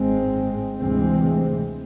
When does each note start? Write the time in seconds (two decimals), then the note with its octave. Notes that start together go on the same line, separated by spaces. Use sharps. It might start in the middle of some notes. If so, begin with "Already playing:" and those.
Already playing: G#1 G#2 G#3 C4
0.78 D2 C3 E3 G#3 C4